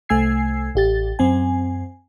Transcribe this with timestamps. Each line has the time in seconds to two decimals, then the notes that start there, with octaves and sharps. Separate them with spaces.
0.09 C2 A3 G#5 E6 G#6 C7
0.75 A1 G4 A6
1.19 F#2 C4 G#5